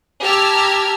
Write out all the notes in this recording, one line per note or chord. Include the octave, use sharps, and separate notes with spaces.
G4 A5 A#5 E6 F6 G#6